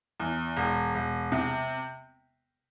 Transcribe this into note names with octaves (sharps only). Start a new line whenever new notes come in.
E2
E1
E1
C3